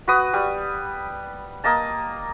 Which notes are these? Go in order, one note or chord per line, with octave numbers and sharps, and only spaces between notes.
F#4 B4 D#6
G3
A#3 D#5 A5